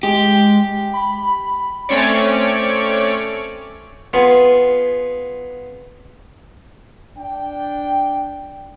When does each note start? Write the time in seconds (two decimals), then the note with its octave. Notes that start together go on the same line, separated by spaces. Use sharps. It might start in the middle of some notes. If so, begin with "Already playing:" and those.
0.03 G#3 G4
0.93 B5
1.89 A3 C4 C#4 C#5 D5
4.13 B3 F4 G#4
7.19 D4 G5